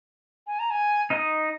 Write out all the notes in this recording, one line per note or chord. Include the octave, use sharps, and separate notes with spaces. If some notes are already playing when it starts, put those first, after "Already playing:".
G#5
A#5
G#5
D#4 D#5